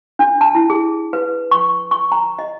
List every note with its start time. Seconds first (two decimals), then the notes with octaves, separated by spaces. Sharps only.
0.19 D4
0.41 A5
0.55 E4
0.70 G#4
1.13 B4
1.51 C#6
1.91 C#6
2.12 A#5
2.39 D#5